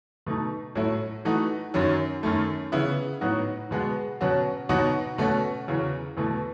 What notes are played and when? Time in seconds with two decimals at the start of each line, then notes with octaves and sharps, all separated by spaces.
0.26 B2 A3 D#4
0.75 A2 F#3 A3 E4
1.25 E3 A3 D#4 F#4
1.74 F#2 D#3 F#3
2.23 F#2 D#3 A3
2.72 C#3 E3 B3 E4
3.21 A2 F#3 B3 D#4 F#4
3.71 B2 G#3 B3 F#4
4.21 B2 F#3 C#4 F#4
4.69 B2 F#3 B3 D#4 F#4
5.18 B2 A3 C#4 F#4
5.68 E2 C#3 F#3 C#4
6.17 E2 B2 A3